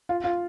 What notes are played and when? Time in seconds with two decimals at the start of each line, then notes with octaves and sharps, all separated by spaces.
0.09 F4
0.24 F4